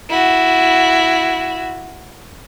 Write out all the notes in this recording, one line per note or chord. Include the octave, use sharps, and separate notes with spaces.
E4 F#4